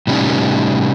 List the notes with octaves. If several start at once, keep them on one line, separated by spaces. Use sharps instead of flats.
A2 C3 G3 C#4 D#4